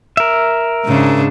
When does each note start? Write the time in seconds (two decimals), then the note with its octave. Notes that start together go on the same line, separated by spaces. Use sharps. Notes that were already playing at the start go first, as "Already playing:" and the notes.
0.17 A#4 E5
0.85 G#2 C#3 D4